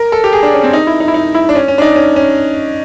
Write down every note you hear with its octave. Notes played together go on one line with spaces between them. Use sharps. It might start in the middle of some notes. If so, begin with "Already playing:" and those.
Already playing: A#4
A4
G4
G#4
D4
C#4
C4
D#4
E4
D#4
E4
D#4
E4
D4
C#4
C#4
D4
D#4
C#4
C#4